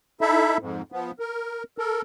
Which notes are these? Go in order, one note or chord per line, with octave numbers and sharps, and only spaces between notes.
D#4 E4 A4 E5
F2 G#2
F3 B3
A#4
A4 A#4